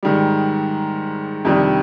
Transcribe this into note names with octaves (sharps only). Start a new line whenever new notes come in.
G#2 D#3 G3
F2 C3 D#3 G3 D4